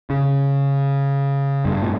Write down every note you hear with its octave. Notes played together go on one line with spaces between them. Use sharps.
C#3
G2
A#2